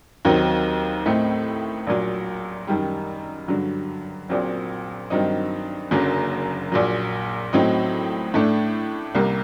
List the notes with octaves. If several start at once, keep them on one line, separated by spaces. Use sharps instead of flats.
D#2 D#3 F#3 C4 D#4
A2 A3 C4 D#4
A#1 A#2 F#3
F#2 D#3 G3
G2 D3 F#3
A#1 A#2 F#3 C4
G2 D#3 F#3 C4 D#4
F#1 F#2 D3 F#3 A#3
A#1 A#2 F#3
A2 F#3 C4 D#4
A2 A3 D4
C2 C3 G3 A#3